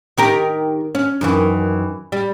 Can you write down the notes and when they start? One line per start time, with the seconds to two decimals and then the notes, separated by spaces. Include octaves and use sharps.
0.18 D#3 G4 A#4
0.95 C#4
1.21 F#2 D#3 E3
2.12 G3